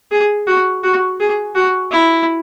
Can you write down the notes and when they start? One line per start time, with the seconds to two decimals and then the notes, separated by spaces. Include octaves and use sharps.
0.11 G#4
0.47 F#4
0.84 F#4
1.20 G#4
1.55 F#4
1.91 E4